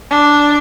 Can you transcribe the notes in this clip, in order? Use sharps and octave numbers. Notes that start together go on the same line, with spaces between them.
D4